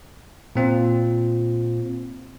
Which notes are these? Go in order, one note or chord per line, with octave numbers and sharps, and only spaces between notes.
A#2 C4 F4